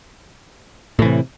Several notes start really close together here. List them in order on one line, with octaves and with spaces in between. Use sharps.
A2 E3 C3